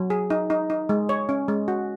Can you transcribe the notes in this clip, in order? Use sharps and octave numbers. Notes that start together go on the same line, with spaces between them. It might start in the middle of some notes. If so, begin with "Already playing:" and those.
Already playing: F#3
G#4
D#4
D#4
D#4
G#3
C#5
C#4
G#3
F#4